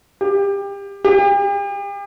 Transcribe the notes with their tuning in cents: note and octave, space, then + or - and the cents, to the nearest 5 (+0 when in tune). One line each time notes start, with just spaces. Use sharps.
G4 +25
G4 +40